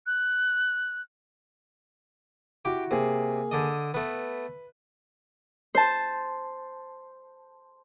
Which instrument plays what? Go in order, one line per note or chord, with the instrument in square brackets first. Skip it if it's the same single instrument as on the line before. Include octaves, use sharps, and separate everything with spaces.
[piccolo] F#6
[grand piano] E4 F#4 [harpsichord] G4 D6
[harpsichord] C3 [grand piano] A#3 G#4
[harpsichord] D3 D4 D#5
[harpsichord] A3 B3 [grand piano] B4
[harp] C5 A5